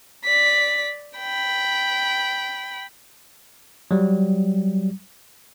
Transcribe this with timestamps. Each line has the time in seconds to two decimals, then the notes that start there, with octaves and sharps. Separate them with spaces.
0.25 D5 B6
1.18 G5 B5
3.91 F#3 G3